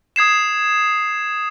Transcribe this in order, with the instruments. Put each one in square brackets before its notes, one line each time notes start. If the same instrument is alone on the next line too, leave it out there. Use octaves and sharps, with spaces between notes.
[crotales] D#6 G#6 C7 E7